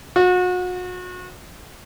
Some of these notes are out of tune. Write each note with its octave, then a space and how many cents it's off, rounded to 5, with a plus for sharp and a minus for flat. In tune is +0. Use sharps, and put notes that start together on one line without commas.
F#4 -35